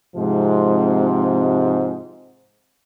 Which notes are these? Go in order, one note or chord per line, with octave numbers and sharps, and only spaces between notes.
G#2 C3 F3 G#3 C4